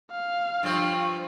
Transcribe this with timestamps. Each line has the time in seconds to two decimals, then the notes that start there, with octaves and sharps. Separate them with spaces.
0.12 F5
0.63 G2 F3 C5